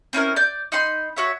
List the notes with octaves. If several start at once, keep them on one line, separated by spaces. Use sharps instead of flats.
C4 C#4 E4 A#4
D5 G6
D#4 B5 C6 G6
F#4 C#5 E5